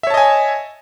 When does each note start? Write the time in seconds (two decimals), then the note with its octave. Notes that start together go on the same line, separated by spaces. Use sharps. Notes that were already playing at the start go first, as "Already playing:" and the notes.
0.03 E5
0.07 C#5
0.10 A5
0.14 D#5
0.17 G#5